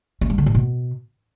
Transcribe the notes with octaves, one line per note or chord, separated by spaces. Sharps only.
C#4
G3
D3
A2
B2